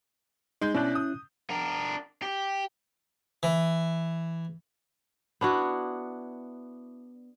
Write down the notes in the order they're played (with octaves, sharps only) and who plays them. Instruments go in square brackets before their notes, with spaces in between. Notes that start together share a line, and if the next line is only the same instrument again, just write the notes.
[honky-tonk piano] G#3 G6 [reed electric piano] D#4
[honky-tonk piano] B2 D4 [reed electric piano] C#4 E4 F#6
[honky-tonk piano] D#6
[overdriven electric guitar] D4 A#4
G4
[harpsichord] E3
[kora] B3 D4 E4 F#4